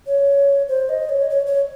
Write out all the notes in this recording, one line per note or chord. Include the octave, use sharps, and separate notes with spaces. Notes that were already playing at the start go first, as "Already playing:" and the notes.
C#5
C5
D#5
C#5
C#5
C#5